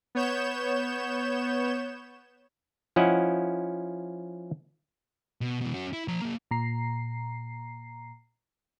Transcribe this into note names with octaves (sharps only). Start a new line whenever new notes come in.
B3 C#5 G6 E7
F3 C#4 E4 D#5 F#5
B2
B2 E3
C#4 F#4
E4
F3 A#5
A#3 G#4
A#2 A#5 C7